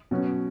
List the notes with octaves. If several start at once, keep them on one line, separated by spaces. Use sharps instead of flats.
B2 F#3 C#4